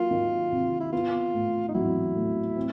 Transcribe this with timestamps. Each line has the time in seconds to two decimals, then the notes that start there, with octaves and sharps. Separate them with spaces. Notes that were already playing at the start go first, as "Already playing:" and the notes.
Already playing: F#3 A#3 F4
0.11 D#3
0.52 C3
0.81 E4
0.93 B3 F4
1.34 A2
1.69 D#4
1.74 F#3 E4
2.16 A2
2.56 C4